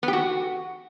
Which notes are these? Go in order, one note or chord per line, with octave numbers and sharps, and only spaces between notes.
B3
G4
F#4